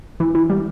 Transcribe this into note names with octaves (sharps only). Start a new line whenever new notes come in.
E3
E3
G3